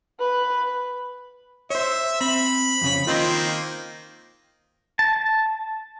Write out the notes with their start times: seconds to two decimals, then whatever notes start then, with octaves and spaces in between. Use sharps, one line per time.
0.20 B4
1.70 C5 C#5 E5
2.21 C4 B5
2.81 F2 C#3 C#4
3.07 D#3 A#3 C4 F4 D#5 C6
4.99 A5